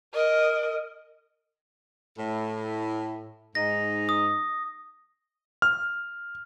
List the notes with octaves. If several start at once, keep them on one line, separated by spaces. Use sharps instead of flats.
A#4 D#5
A2
G#2 D#4 A#6
D#6
F6